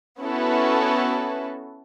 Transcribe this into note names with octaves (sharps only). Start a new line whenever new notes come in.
B3 C#4 E4 F#4 A4 B4